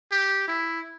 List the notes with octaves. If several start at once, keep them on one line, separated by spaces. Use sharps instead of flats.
G4
E4